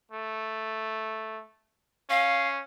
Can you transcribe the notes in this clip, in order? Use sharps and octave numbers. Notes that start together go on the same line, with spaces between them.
A3
C#4 F5